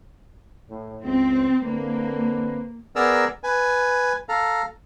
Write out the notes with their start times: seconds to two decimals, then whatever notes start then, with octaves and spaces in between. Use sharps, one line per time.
0.70 A2
1.04 C#2 C4
1.65 D3 A#3 C4 B4
2.96 B3 G#4 A#4 D5 A#5 E6
3.44 B4 G#5
4.29 A4 F5 A#5